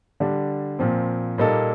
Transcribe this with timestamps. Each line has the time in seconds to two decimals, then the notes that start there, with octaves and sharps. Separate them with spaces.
0.20 D3 G3 D4
0.79 A#2 F3 C4
1.38 A#2 G3 A#3 D#4 A4